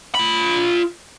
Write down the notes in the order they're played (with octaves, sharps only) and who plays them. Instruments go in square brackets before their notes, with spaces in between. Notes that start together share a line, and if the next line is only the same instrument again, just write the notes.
[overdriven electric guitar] F4 B5